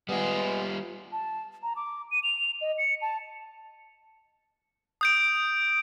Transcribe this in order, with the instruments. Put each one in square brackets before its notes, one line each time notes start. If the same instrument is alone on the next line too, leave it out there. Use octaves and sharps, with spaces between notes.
[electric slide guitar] G3 F4 [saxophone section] G#3 B3
[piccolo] A5
A#5
D6
D#7
F7
D#5
C#7
A5
[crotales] D#6 G6 D7